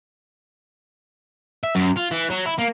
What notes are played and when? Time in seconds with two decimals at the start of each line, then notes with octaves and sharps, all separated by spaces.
1.64 E5
1.75 F#2
1.97 F4
2.11 E3
2.30 F#3
2.46 E4
2.59 A#3